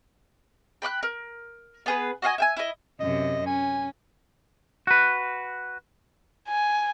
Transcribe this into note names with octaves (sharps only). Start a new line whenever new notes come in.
G5 B5 D6 F#6
A#4
B3 G#4 B4
F#4 D#5 F5 G#5
E5 G5 G#5
E4 D#5
F#2 C3 D#5
C#4 G#5
F#4 B4
G#5